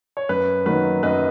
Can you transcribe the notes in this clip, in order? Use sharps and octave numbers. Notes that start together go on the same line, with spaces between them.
C#5
F#2 B4
D#3 F#3 A#3 B4
F#2 B4 D#5